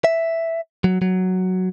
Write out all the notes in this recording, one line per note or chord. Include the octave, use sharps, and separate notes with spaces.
E5
F#3
F#3